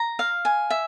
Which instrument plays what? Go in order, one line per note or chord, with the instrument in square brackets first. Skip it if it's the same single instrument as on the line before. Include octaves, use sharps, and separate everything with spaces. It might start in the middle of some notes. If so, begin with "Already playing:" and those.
Already playing: [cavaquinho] A#5
F5
G#5
E5